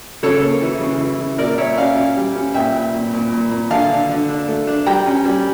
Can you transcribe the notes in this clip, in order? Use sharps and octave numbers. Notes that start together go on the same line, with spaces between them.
C#3 A4 C#5
A#3
E3
C#3
E3
C#3
A#2 A#4 D5
A#2 C#5 E5
C#4 D5 F5
C#4
G3
C#4
A#2 E5 G5
A#2
A#2
A#2
A#2
A#2
D3 F5 A5
D3
D3
D4
A3
D4
G3 G5 A#5
C#4
G3